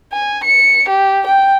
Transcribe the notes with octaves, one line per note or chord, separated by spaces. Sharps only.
G#5
C#7
G4
G5